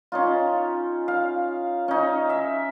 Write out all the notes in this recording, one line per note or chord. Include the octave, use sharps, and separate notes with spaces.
C#4 D#4 F4
F5
C#4 D#4
E5